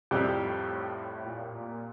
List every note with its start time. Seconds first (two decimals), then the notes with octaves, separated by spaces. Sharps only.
0.11 F2 A2 C3 G3 C4 G4
1.23 A#2
1.52 A#2